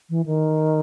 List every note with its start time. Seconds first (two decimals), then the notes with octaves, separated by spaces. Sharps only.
0.10 E3
0.26 D#3